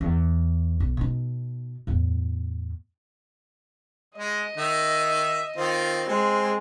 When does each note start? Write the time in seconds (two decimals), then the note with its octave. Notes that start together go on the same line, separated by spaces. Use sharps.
0.01 E2
0.80 B1
0.97 B2 D#4
1.87 E2 A2
4.18 G#3 D#5
4.57 D#3 E5
5.56 D#3 C4 F4
6.08 G#3 C4